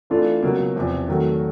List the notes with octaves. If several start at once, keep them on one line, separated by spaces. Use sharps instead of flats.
E3 A3 D4 F4 A4
C#2 B2 F#3 A#3
E2 C3 F3
D#3 F#3 A3